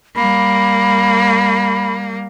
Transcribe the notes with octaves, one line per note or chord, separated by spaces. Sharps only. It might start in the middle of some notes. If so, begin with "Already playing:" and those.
G3 A#3 B5